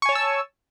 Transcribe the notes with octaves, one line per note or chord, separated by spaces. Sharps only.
C#5 G#5 A5 C#6 E6